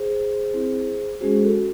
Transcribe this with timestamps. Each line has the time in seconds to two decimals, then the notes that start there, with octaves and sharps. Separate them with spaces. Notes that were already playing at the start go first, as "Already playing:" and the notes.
Already playing: G#4 C5
0.54 C4 E4
1.20 G#3 C#4 F#4 G#4 C5
1.43 F#4 A4